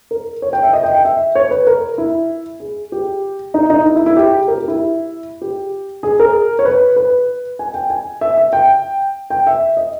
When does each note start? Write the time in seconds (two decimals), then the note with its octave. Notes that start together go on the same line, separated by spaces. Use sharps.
0.11 A#4
0.42 C#5
0.53 G5
0.63 E5
0.73 D#5
0.83 G5
0.94 G5
1.05 E5
1.35 C#5
1.51 B4
1.67 A#4
1.98 E4
2.60 G#4
2.92 G4
3.54 D#4
3.70 D#4
3.86 E4
3.96 E4
4.06 E4
4.16 G4
4.48 A#4
4.58 G4
4.68 E4
5.41 G4
6.03 G#4
6.20 A#4
6.59 C#5
6.65 B4
6.96 B4
7.59 G#5
7.74 G5
7.90 G#5
8.21 E5
8.37 E5
8.53 G5
9.30 G5
9.47 E5
9.77 D#5